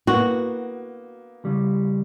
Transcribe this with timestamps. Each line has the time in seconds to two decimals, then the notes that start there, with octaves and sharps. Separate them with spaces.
0.07 A#3 B3 F#4
1.45 C#3 G3